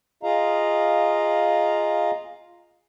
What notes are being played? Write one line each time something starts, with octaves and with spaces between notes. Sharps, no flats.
F4 G#4 D#5 F5 A#5